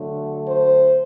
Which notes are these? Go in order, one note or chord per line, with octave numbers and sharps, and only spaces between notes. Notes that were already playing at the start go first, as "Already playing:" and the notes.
Already playing: D3 F#3 A3
C5